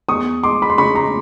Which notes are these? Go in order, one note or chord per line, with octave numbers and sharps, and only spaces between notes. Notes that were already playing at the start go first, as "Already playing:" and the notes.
E2 C#6 D#6
G#3 C6 D6
B5
C6
C#3 B5 C#6
A#5 C6